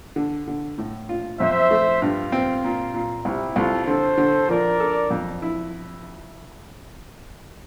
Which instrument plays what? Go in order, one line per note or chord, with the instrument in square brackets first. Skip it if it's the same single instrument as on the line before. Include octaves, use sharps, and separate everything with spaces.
[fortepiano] D3
D3
A2
F4
[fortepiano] F2 [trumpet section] C5 E5
[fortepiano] A3
[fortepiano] G2 [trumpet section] F4
[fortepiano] C4
A#2
A#2
[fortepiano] C2 [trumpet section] E4 G4
[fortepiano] C2 [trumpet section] F4 A4
[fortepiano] D3 [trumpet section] A4 C5
[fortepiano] D3
[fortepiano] F3 [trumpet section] A#4 D5
[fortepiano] A4
F2
E4